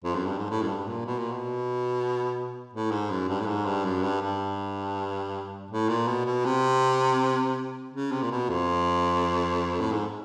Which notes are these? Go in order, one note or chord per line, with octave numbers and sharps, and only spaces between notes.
F2
F#2
G2
G#2
A2
F#2
G2
A#2
B2
A#2
B2
A2
G#2
F#2
G2
A2
G#2
G2
F#2
G2
G2
A2
A#2
B2
B2
C3
C#3
C3
A#2
B2
F2
A2
G#2